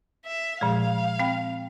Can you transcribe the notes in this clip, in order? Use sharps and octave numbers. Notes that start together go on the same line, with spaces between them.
E5
A#2 F3 G#3 F5
C4 G5 B5